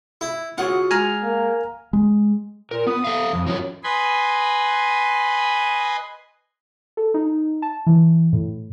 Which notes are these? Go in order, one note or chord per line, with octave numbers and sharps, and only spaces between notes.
E4
F4 F#4 G#4 C#5 F#5
G#3 G#5 A#5 F6
A#3
G#3
A#2 A#4
B3 D#6
A4 E5 F5
F2
F3 F#3 C#4 F4
B4 D#5 G#5 B5 C6
A4
D#4
A5
E3
A2